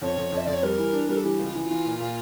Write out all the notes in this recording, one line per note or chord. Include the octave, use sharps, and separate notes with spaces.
F2 C#5
F2
F2
E5
F2 D5
C#5
G3 A#4
E3
D4
G3 A#4
A4
E3 G4
C#2
F4
E3
F4
E3
A#2
A#2